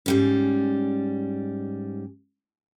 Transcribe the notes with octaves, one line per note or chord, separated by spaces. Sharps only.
G#2 G3 C#4